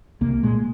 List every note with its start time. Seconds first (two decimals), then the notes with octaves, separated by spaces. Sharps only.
0.21 C2 A#3
0.43 A#2 G#3